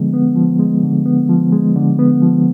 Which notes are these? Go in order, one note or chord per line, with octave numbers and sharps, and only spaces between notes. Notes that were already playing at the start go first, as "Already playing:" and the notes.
Already playing: D3 F3 G#3 B3
B3
F3
G#3
D3
B3
F3
G#3
D3
B3
F3